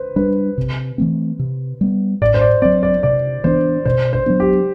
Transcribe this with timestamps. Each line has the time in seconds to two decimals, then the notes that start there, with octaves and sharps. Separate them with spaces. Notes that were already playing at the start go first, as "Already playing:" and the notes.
Already playing: B4 C5
0.16 G3 D4 B4
0.58 C3
0.98 E3 A3 C4
1.39 C3
1.81 G3 B3
2.21 A2 D5
2.34 C5
2.41 D5
2.62 C4 D5
2.65 F#3
2.83 D5
3.03 C3 D5
3.44 E3 B3 D4 C5
3.85 B2 C5
4.13 C5
4.26 F#3 B3 D4
4.40 G4